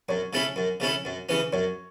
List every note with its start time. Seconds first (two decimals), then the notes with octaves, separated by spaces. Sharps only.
0.09 F#2 C#5
0.33 C#3 A3 C#4 E4
0.56 F#2
0.80 C#3 A3 C#4 E4
1.05 F#2
1.29 C#3 E3 C#4
1.53 F#2 C#5